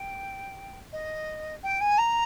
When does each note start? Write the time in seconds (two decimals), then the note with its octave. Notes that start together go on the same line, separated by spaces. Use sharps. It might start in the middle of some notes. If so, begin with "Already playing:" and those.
Already playing: G5
0.93 D#5
1.63 G5
1.81 G#5
1.98 A#5